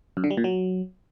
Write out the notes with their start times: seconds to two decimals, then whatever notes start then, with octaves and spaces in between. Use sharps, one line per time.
0.17 F#2
0.24 D3
0.31 G3
0.37 A#2
0.44 F#3